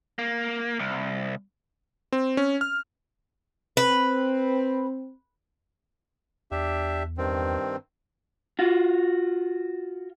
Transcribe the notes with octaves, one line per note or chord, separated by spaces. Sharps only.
A#3
C2
C4
C#4
F6
C4 B4
E2 D4 G4 E5
G2 D#3 C4
F4 F#4